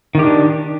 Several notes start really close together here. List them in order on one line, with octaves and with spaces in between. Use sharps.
D#3 G4 D4